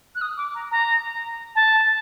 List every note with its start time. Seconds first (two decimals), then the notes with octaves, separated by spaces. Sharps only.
0.15 F#6
0.22 D#6
0.37 D6
0.55 A#5
0.71 A#5
1.55 A5